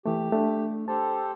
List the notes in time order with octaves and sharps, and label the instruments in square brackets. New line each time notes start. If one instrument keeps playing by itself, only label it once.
[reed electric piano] E3 A3 [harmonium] G4
[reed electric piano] A3 D4
[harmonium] G4 A4 C5 [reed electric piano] A5